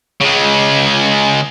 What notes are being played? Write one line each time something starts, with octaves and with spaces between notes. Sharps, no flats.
C#3 G#3